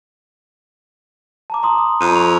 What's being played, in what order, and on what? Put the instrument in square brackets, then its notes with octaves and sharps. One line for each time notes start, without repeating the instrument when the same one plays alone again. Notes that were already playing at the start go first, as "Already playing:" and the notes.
[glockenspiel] A5 A#5 D6
A#5 C6 D#6
D#6
[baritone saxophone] F2 [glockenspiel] D#7
[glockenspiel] C#6 F7